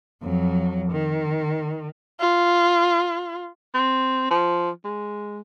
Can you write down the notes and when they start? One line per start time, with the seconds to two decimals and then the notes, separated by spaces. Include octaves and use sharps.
0.23 F2 F#3
0.92 D#3
2.19 F4
3.75 C4
4.31 F3
4.85 G#3